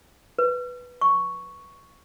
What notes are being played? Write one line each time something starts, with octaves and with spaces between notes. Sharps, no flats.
B4
C#6